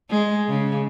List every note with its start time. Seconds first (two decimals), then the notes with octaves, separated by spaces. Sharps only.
0.11 G#3
0.49 C#3